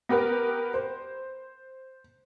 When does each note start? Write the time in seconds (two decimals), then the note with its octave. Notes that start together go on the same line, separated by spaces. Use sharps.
0.09 B3 G4 A#4 B4
0.74 C5